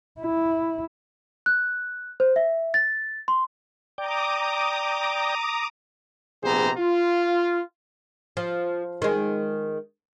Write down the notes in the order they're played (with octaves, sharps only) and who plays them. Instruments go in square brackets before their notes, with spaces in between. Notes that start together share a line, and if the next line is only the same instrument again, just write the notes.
[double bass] E4
[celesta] F#6
C5
E5
A6
C6
[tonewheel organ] D5 G5 [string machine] A#5 D6 D#6
[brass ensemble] A#1 C3 B3 G#4 C5 A#5
F4
[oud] F3
D#3 G#3